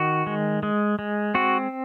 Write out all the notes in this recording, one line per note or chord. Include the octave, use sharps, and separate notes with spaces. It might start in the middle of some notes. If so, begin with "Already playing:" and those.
Already playing: D#3 F#4
G#3
G#3
G#3
C4 F#4